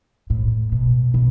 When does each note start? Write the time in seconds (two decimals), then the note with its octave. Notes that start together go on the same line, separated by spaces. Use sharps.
0.30 A2
0.72 B2
1.14 B2